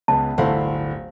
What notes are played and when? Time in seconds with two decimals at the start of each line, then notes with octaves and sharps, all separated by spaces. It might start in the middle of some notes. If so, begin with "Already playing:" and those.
0.08 C#2 C#3 B3 A5
0.38 D1 G1 E3 A3 C5 F5 F#5 B5